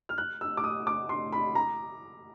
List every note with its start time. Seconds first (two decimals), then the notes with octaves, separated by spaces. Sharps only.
0.09 F6
0.18 F#6
0.41 E6
0.57 D6
0.64 D#6
0.87 D6
1.09 C6
1.33 B5
1.55 A#5